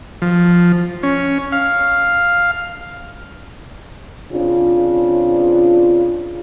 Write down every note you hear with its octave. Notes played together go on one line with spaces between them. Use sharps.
F3
C#4
F5
C#3 C4 D4 F4